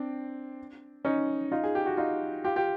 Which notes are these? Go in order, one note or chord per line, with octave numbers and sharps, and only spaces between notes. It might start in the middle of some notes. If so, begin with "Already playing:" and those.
Already playing: C4 D4
C#4 D#4
D#4 F4
G#4
G4
F#4
D#4 F4
F4 G4
F4 G4